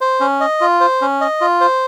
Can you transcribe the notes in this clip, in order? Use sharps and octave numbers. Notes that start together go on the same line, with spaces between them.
C5
C#4
D#5
F4
C5
C#4
D#5
F4
C5